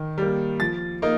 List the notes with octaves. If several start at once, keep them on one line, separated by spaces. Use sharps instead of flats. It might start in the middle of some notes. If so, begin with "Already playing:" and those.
Already playing: D#3
G3 A#3
F3 A6
A#3 D#4